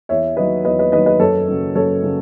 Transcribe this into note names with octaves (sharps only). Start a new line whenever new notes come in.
E2 C#5 E5
D#3 F#3 B4 D#5
E2 B4 D#5
B4 D#5
D#3 F#3 B4 D#5
B4 D#5
F#2 A4 C#5
C#3 F#3 C#4
F#2 A4 C#5
C#3 F#3 C#4